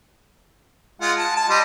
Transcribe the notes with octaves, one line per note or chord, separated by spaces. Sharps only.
G#3 F4 F#5
A5
A5
G3 D#5 C6